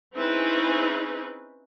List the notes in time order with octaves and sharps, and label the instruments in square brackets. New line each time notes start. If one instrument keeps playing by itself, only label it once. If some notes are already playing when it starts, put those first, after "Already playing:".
[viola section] C4 C#4 D#4 E4 G#4 B4